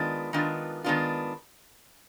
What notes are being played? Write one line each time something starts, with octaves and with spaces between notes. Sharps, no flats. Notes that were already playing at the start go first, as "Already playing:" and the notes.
Already playing: D#3 G#3 B3 D4 F4
D#3 G#3 B3 D4 F4
D#3 G#3 B3 D4 F4